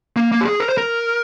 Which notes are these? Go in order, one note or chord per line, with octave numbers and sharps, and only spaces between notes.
A#3
A#3
G4
G#4
A#4
C5
A#4